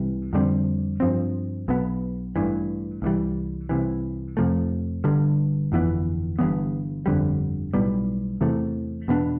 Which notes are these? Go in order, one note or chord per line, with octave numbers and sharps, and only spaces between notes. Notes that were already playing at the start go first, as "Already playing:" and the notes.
Already playing: C2 C3 E3 G3
F2 D3 G3 C4
G2 F3 C4
B1 B2 B3
A1 G2 E3
C2 C3 E3 G3
C2 C3 E3
F2 C3 F3 A3
G1 G2 D3 G3
G1 F2 E3 B3
G1 G2 E3 B3
G1 F2 D3 G3
B1 A2 G3 B3
E2 C3 E3 A3
E2 B2 B3 D4